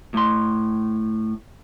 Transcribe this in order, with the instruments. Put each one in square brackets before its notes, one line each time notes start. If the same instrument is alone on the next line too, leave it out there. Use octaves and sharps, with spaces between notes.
[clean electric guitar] A2 C6